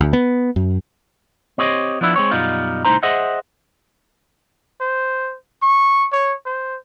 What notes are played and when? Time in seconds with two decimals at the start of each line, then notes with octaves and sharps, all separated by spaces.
0.01 D2
0.13 B3
0.56 F#2
1.58 C4 G4 C#5 D#5
2.01 F3 B3 D4 E4
2.16 G#3 C4 C#5
2.31 F#2 B2 G3 D#4 F4
2.85 C2 A2 G#3 D#4 C5 A#5
3.03 G#4 C5 D#5 E5 F#5
4.81 C5
5.62 C#6
6.13 C#5
6.46 C5